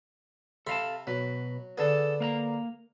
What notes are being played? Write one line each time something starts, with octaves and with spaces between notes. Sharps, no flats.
C3 A4 F5 A5 B5 C6
B2 F#3 B4
D3 B3 G#4 A4
A#3 F5 A#5